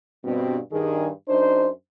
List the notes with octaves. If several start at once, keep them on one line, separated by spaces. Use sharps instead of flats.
G2 B2 C4
G2 D#3 G#4
F#2 D4 D#4 C5